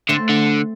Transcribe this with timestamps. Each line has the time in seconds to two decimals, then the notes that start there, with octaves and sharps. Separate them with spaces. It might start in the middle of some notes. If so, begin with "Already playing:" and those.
0.09 D3 A3 C4
0.29 D3